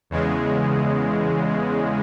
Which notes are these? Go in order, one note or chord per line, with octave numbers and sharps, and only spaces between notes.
E2 C#3 G#3